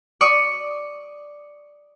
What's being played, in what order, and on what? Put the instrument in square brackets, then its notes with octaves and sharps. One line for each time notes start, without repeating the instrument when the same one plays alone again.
[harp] D5 C#6 D#6